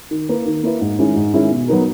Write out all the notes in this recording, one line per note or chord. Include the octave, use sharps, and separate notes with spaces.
D#3
A#3 E4 B4
D#3
A#3 E4 B4
G#2
D#3 G#3 C#4 E4
G#2
D#3 G#3 C#4 E4
B2
F#3 B3 D#4 A#4